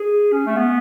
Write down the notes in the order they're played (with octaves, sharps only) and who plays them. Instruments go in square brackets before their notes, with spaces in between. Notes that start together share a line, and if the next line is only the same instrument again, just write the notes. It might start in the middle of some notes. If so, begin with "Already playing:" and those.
Already playing: [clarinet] G#4
C#4
A3
B3